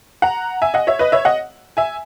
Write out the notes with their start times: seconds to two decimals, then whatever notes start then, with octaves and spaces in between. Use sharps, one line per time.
0.22 F#5 A#5
0.62 E5 G#5
0.74 D#5 F#5
0.87 C#5 E5
0.99 B4 D#5
1.12 C#5 E5
1.25 D#5 F#5
1.77 E5 G#5